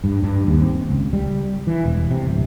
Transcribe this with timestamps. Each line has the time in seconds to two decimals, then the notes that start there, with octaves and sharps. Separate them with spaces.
0.04 G2
0.24 G2
0.47 D#2
0.61 C4
0.90 C#2
1.13 G3
1.67 E3
1.86 E1
2.11 C3
2.27 D1